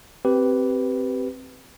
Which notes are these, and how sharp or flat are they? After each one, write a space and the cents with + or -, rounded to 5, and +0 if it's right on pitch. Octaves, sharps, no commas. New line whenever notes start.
C4 +0 G4 -15 B4 +0